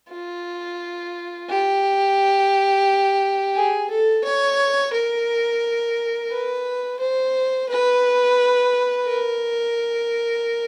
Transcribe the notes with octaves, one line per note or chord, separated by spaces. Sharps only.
F4
G4
G#4
A4
C#5
A#4
B4
C5
B4
A#4